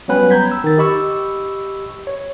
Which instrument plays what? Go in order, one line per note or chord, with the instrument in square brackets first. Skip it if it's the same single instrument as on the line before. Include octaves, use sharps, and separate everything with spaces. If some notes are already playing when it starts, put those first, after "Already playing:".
[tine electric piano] F#3 G3 B3 C#4 B4 G5
A#5 B5 G6 G#6 B6
E6
D#3 A6
G4 D#5 B5 C#6 E6
C#5